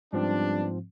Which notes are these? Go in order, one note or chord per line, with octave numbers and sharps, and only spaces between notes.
G#2 F3 G3 B3 C4 D4